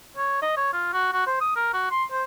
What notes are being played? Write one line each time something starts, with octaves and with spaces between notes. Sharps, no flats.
C#5
D#5
C#5
F4
F#4
F#4
C5
D#6
A#4
F#4
C6
C5